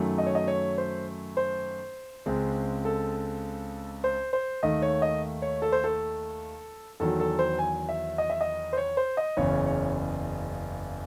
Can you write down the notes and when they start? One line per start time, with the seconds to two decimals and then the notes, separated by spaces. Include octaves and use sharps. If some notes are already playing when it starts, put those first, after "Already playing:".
Already playing: F#2 D#3 F#3 A3
0.18 D#5
0.26 C#5
0.35 D#5
0.47 C#5
0.78 C5
1.37 C5
2.26 C#2 C#3 G#3 C4
2.85 A4
4.04 C5
4.33 C5
4.63 D#2 D#3 A3 D#5
4.82 C#5
5.02 D#5
5.42 C#5
5.62 A4
5.72 C5
5.84 A4
7.00 E2 D#3 F#3 A4
7.20 A4
7.39 C5
7.59 G#5
7.89 E5
8.18 D#5
8.30 E5
8.41 D#5
8.73 C5
8.77 C#5
8.97 C5
9.17 D#5
9.37 F#1 E2 C#3 C#5
9.66 C#5